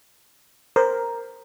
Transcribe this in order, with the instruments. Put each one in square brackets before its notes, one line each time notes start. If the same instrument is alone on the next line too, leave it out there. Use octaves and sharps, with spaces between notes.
[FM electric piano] A#4 [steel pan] C5